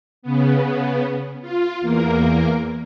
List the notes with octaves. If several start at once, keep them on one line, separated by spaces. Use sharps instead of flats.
C#3 B3
F4
E2 A#3 A#4